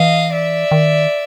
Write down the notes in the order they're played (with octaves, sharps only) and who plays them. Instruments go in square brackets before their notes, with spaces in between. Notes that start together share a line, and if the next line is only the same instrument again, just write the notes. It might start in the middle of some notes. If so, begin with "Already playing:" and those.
Already playing: [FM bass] E3 [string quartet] D#5 F5
[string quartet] D5 E5
[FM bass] D#3